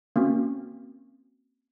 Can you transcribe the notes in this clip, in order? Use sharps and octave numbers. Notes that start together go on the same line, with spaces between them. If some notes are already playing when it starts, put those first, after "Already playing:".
A#3 C4 C#4 F#4